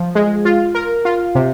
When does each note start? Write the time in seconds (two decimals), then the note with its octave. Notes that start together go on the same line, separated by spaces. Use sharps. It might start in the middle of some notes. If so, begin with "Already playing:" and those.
Already playing: F3
0.15 G#3
0.45 F4
0.75 A#4
1.05 F4
1.35 C3